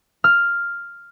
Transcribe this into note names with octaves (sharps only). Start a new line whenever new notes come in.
F6